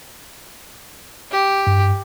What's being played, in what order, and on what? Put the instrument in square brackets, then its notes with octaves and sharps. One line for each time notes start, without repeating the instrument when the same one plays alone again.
[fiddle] G4
[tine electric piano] G2